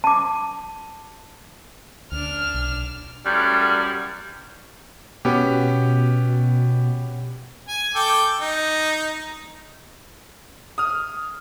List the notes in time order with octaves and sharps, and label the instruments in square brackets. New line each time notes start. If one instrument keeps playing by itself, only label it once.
[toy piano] A5 D6
[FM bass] D2 [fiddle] D4 F6
[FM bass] B1
[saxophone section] F#2 A2 G3
[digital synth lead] B2 [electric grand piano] B3 C#4 G4
[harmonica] G#5
A4 G5 D6
D#4
[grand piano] D#6 F6